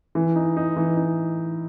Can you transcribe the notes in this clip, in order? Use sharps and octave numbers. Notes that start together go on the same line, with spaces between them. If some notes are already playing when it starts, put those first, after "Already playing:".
E3
D#4
D#4
E3
D#4